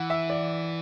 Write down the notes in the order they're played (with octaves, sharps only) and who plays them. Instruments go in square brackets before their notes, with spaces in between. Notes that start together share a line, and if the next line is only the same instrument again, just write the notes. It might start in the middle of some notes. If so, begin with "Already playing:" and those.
Already playing: [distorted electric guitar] E3 [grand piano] F#5
[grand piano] E5
D5